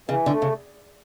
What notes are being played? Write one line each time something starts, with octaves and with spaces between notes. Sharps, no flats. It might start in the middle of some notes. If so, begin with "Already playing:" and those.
C#3 E3
D3
A3
C#3